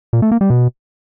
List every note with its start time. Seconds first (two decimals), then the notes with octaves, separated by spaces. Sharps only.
0.13 A#2
0.22 A3
0.32 A#3
0.41 G3
0.50 B2